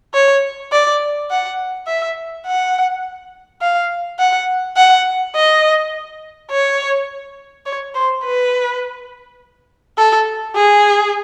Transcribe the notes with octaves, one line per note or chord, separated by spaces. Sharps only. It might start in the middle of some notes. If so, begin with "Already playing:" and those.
C#5
D5
F#5
E5
F#5
F5
F#5
F#5
D#5
C#5
C#5
C5
B4
A4
G#4